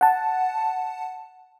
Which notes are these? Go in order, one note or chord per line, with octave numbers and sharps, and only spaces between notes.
F#5 A5